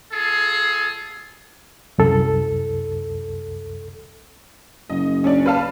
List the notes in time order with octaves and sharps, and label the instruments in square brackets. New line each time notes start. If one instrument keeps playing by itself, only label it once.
[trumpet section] F4 G#4 A4
[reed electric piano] C2 F#2 A4
[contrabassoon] F#1 [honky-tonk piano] D#5
[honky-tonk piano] C#4 D4 D5
B4 F5 A5